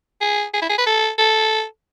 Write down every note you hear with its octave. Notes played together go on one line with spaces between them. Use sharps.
G#4
G#4
E4
G#4
B4
A4
A4